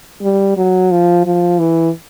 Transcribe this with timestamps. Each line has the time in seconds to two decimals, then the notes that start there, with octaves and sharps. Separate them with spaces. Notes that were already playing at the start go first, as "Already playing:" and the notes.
0.22 G3
0.57 F#3
0.91 F3
1.26 F3
1.59 E3